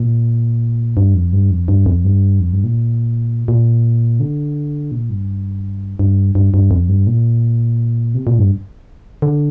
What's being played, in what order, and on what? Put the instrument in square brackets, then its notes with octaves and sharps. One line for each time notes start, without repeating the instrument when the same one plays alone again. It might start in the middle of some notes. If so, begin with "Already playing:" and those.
Already playing: [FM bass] A#2
G2
F2
G2
F2
G2
F2
G2
F2
G2
A#2
A#2
D3
A#2
G2
G2
G2
G2
F2
G2
A#2
C3
A#2
G2
D3